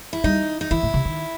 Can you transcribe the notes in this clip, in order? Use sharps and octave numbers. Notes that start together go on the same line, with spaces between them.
E4
G3 D#4
D#4
E3 E4
A2
C3
D#3